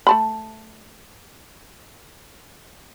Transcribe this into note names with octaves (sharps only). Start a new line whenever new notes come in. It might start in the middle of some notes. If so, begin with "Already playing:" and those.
A3 A5 B5